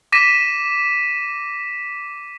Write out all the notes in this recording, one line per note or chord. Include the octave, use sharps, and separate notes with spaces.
D6 A#6 B6 D#7 E7